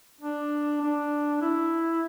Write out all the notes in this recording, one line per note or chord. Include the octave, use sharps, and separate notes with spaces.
D4
D4
E4